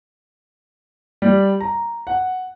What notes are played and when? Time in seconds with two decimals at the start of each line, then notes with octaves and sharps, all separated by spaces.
1.22 G3
1.60 A#5
2.07 F#5